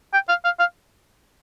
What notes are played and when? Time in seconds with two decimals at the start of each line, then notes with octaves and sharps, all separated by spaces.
0.14 G5
0.29 F5
0.44 F5
0.60 F5